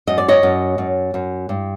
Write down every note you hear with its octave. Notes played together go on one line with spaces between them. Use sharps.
F#2 D#5
D5
C#5 D#5
F#2
F#2
F#2
G2